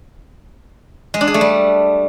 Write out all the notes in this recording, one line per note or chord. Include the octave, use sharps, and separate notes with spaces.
G#3
D4
G#4
A3
G3